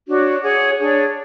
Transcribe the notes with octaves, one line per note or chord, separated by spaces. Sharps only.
D4 F#4 C#5
G#4 C#5 F#5
D4 G#4 C#5